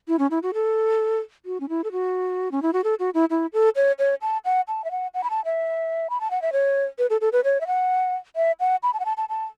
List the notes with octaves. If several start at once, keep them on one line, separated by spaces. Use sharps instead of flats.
E4
C#4
E4
F#4
A4
F#4
C#4
E4
A4
F#4
C#4
E4
F#4
A4
F#4
E4
E4
A4
C#5
C#5
A5
F#5
A5
E5
F#5
F#5
B5
A5
E5
B5
A5
F#5
E5
C#5
B4
A4
A4
B4
C#5
E5
F#5
E5
F#5
B5
A5
F#5
A5
A5
A5